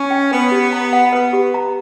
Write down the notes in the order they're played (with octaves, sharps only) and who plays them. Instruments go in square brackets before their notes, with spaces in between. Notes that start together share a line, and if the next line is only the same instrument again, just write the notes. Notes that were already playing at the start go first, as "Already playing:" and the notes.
Already playing: [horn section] C#4
[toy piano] G5
[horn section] B3 [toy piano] B4
[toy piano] G4
A#5
F#5
[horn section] B3 [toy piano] B4
[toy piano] G4
A#5